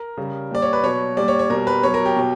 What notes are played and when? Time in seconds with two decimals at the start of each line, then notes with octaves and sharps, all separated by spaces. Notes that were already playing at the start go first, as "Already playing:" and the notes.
Already playing: A#4
0.17 C#3 G3
0.51 A#2 G3 D5
0.62 C#5
0.73 B4
0.83 B2 F#3 C#5
1.17 A#2 G3 D5
1.28 C#5
1.39 C#5
1.50 B2 G3 A#4
1.67 B4
1.83 B2 F#3 C#5
1.94 A#4
2.05 G4
2.16 B2 F#3